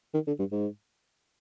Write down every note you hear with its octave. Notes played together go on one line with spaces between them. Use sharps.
D#3
D3
G2
G#2